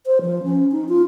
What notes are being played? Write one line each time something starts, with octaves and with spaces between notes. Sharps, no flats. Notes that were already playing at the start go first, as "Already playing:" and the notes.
C5
F3
C#4
D#4
F4